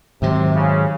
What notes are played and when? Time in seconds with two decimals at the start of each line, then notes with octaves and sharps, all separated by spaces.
0.21 G#2 C3 D#3 F#3
0.53 C#3